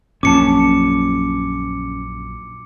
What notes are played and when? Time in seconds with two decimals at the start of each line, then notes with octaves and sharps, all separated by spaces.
0.23 A#1 F#2 A#2 C#4 A5 D6 C#7